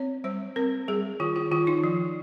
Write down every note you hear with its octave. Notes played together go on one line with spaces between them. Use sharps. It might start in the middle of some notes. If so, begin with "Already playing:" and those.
Already playing: C4 C#5
G3 C5
C4 A#4
G3 G#4
D#3 F4
F4
D#3 F4
D#4
F3